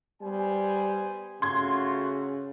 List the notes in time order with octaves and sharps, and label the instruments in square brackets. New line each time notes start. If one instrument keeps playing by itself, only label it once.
[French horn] G3 [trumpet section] B3 C5 G#5
[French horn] C#3 [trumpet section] A3 F4 F#4 [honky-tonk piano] C6 G#6